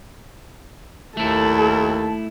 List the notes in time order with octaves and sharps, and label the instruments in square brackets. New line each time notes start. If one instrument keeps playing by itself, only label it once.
[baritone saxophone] D#2 [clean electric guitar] A3 E4 [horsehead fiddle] A4